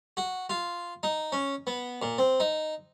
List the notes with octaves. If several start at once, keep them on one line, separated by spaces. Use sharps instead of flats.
F#4
F4
D#4
C#4
B3
A#2
C4
D#4